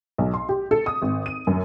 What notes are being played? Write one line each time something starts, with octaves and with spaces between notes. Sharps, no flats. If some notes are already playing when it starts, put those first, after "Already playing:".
B1
C6
G4
A4
D#6
G#1
D#7
F#2